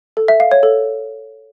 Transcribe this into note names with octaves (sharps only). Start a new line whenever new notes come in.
A4
E5
F5
C#5
A4